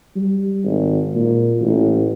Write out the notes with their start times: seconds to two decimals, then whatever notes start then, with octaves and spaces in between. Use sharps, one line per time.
0.16 G3
0.64 G#1
1.14 A#2
1.61 A1